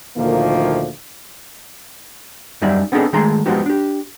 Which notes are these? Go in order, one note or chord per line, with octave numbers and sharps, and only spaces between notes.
D2 A#2 D#3 F3 A3 A#3
F#2 G3 D#4 D5 E5
B3 C4 D4 D#4 G#4 A4
D#3 G#3 A3 G#4 A#5 C6
F3 G#3 B3 D#4 F#4 G4
D4 G4